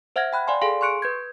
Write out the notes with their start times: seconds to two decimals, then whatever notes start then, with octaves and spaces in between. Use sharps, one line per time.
0.16 C5 E5 F#5 F6 G#6 A#6
0.33 G5 B5 F#6
0.47 D5 F5 G#5 C6
0.61 G#4 A4 F5 G#5 C6
0.81 C6 C#6 F#6 C#7 D7
1.02 B4 G6 G#6